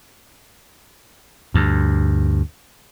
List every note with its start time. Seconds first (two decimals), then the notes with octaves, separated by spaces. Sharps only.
1.54 D2 G2